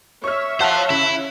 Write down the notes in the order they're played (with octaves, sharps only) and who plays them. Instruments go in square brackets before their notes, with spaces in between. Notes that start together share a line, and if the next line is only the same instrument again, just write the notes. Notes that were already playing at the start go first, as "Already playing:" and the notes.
[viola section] C#5 E5 [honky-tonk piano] C#6 F6
[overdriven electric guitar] C5 F5 [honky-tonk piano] F#5 A5 F#6
[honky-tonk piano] C#3 [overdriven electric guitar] E4